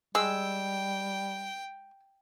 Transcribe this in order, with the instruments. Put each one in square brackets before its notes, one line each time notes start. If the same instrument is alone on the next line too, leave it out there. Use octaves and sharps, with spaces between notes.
[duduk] G3 [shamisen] G#3 [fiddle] G5 [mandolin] E6